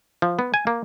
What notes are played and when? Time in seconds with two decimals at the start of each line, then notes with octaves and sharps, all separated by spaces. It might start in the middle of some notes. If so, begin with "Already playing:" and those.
0.22 F3
0.39 B3
0.54 G#5
0.67 A#3